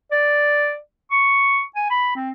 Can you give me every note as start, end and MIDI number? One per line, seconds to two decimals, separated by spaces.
0.12 0.76 74
1.11 1.62 85
1.76 1.87 80
1.90 2.12 83
2.16 2.31 60